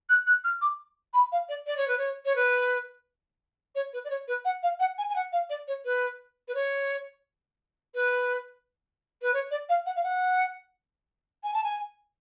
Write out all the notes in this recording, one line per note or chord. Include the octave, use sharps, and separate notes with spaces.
F#6
F#6
F6
D6
B5
F5
D5
D5
C#5
B4
C#5
C#5
B4
C#5
B4
D5
C#5
B4
F#5
F5
F#5
G#5
G#5
F#5
F5
D5
C#5
B4
B4
C#5
B4
B4
C#5
D5
F5
F#5
F5
F#5
G#5
A5
G#5